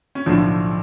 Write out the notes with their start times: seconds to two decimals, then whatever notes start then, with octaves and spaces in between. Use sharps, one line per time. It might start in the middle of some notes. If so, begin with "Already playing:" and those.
0.15 C#4
0.26 B1 A2 D3 F3 D4